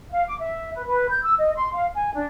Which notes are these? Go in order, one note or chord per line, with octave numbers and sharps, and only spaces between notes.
F5
D6
E5
B4
B4
G6
E6
D#5
C6
F5
G#5
D4